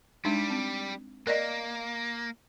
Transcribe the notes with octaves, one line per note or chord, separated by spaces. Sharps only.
G3 G#3 D4 D#4
C4
A#3 A#4 D5 D#5